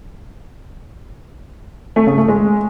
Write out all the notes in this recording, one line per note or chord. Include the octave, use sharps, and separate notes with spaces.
A3
C#3
A3
G#3